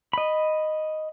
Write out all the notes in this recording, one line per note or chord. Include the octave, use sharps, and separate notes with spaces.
D#5 B5